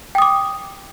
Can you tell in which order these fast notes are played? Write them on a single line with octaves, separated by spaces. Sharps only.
G5 D#6 D6